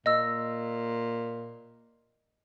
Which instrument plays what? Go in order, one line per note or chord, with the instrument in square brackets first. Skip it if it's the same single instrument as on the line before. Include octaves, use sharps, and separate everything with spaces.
[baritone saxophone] A#2 [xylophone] D#5 E6